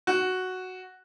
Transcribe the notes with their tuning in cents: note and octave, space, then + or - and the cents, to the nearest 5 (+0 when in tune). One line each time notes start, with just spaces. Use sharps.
F#4 +0